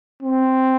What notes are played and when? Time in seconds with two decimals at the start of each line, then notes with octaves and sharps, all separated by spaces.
0.23 C4